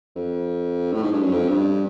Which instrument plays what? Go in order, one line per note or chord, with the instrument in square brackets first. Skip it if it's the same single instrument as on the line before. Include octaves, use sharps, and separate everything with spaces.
[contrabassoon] F2
A2
G#2
G2
F#2
F2
G2